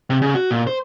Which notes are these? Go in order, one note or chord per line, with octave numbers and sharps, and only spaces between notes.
C3
C#3
F#4
A#2
C5